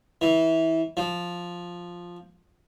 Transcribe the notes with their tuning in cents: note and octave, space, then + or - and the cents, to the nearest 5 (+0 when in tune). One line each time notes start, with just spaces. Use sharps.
E3 -20
F3 +5